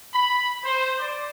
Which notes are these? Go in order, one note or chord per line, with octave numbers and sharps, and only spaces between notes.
B5
C5
D5